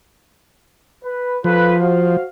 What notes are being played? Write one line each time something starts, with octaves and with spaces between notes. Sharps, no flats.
B4
F3 F4 A4 B4
F#4 C5 F5